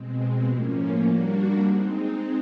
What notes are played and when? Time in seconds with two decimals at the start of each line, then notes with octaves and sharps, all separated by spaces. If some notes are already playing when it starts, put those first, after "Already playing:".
Already playing: B2 G#3 C4
0.48 A2 F3 A#3 C#4
1.05 G3 A#3 D4 F#4
1.61 G#3 C4 D#4